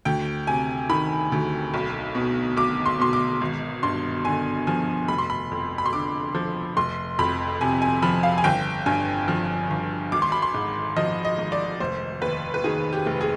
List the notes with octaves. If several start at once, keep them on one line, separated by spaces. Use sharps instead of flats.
D2 G5
C3 G#5
D#3 B5
D2
B1
B2
B1 D6
C6
B2 C6
D6
G#1
G2 C6
D3 G#5
F3 G#5
F1 B5
C6
B5
F2
B5
C6
D3 D6
F3
F1 C6
F2 B5
C3 G#5
G#5
F3 B5
F5
G#5
G1 G5
G2 G#5
F3
G1
G#1 D6
C6
B5
C6
G#2
F3 D#5
D#5
G#1
D5
F1 C5
D#2 B4
B4
D#3 G#4
G4
F1
G#4